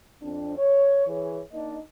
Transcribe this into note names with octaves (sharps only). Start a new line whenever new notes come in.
F2 C4 D4
C#5
E3 G#4 C#5
A#3 D4 D#4 D#5